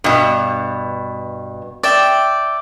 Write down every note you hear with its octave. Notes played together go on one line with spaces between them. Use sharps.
G2 B2
D5 E5 G5